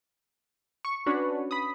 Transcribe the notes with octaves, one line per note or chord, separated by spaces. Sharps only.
C#6
C#4 D4 F#4 B4 C#5
B5 D#6